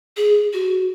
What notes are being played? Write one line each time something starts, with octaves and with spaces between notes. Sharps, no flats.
G#4
F#4